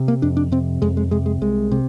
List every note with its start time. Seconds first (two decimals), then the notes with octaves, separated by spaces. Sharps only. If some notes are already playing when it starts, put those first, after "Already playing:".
Already playing: C3
0.08 A#3
0.22 F2 D4
0.37 D4
0.52 C3 C4
0.82 F2 G#3
0.97 G#3
1.11 C3 G#3
1.26 G#3
1.41 C2 G#3
1.72 C3